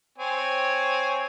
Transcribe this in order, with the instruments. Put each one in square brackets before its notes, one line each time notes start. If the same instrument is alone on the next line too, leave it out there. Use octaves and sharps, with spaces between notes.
[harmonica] C4 C#5 G#5